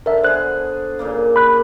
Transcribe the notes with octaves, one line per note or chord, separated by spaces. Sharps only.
D3 A#4 E5
D3 B3 G#4 C5 F#6
A#2 C#3 A#3
B5 F#6